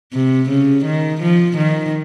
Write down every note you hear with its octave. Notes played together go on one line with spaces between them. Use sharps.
C3
C#3
D#3
F3
D#3